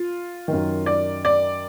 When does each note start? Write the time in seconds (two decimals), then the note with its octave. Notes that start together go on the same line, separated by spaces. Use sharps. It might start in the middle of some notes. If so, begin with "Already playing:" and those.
Already playing: F4
0.48 F#2 D#3
0.86 D5
1.25 D5